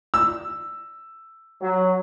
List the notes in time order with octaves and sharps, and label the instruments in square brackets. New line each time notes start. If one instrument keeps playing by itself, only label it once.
[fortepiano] E6
[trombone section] F#3